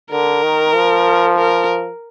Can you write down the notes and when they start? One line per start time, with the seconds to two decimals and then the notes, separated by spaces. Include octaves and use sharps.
0.11 D3 A#4
0.43 D#3
0.75 F3
1.38 A#4